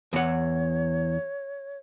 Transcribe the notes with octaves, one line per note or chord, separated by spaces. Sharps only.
E2 C#5 F#5